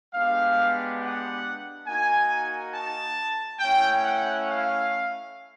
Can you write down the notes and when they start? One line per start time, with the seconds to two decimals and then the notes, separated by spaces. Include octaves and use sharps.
0.13 G#3 B3 D4 G4 F5
1.00 F#5
1.86 A#3 D#4 F#4 G#5
2.73 A5
3.59 A3 C#4 E4 G5
4.03 F#5
4.46 F5